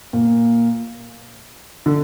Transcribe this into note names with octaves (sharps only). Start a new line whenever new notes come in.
A#2
D3